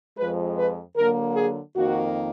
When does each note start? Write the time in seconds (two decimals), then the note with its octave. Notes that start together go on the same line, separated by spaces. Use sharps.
0.17 F2 F3 G#3 B4
0.57 B4
0.96 D3 F#3 A#3 A#4
1.35 G#4
1.75 F2 D#3 A#3 F#4